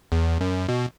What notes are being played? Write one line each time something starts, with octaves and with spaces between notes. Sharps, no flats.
E2
F#2
B2